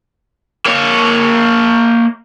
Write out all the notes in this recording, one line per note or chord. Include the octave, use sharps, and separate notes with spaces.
A#3 C#5